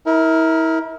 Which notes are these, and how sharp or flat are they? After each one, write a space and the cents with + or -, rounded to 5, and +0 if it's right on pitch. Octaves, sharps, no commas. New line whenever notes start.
E4 -35 A#4 +0